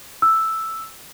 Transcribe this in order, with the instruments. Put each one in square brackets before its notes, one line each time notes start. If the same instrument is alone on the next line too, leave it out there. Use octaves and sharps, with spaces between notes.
[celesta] E6